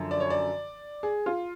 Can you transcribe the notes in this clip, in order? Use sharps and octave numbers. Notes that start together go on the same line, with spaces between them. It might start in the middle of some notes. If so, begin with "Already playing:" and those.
Already playing: F#2 D3 F3
D5
C#5
D5
G#4
F4